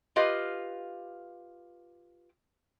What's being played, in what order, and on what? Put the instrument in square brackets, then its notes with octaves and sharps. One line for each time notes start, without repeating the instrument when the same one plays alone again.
[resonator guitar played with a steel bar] F4 G4 B4 D#5 F5